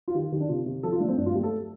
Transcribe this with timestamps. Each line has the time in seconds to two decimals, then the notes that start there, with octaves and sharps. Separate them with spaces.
0.08 F4
0.14 D#3 G4
0.32 D#3 G4
0.40 D4
0.49 C3 F4
0.66 C3
0.83 F3 A4
0.92 F4
1.00 A3 D4
1.09 C4
1.17 G2 D4
1.26 F4
1.35 A3 G4
1.43 A4